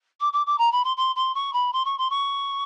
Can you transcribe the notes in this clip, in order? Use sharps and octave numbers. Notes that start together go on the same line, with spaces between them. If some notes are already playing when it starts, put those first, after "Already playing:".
D6
D6
D6
A#5
B5
C6
C6
C6
C#6
B5
C6
C#6
C6
C#6